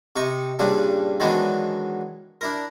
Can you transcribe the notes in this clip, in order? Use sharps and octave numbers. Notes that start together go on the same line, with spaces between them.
C3 D#4 C#6
G2 A#2 C#3 G3 D4
D#3 E3 F#3 G#3 B3 D4
D4 E4 A#4